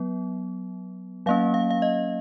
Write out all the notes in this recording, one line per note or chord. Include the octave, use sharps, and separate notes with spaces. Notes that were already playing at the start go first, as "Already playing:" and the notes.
Already playing: F#3 B3
F#3 A#3 C#4 F5
F5
F5
D#5